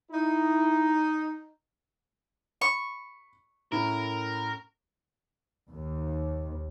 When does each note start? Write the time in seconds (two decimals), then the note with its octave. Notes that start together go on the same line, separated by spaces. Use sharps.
0.11 D#4 E4
2.62 B5 C#6
3.72 A2 C#4 E4 A#4
5.71 D#2